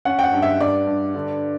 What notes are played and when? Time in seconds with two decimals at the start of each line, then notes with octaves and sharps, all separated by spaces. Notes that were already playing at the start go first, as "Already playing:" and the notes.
0.05 C#4 F#5
0.19 G5
0.23 F#5
0.33 G2
0.42 E5
0.60 G2 D5
0.87 G2
1.15 D3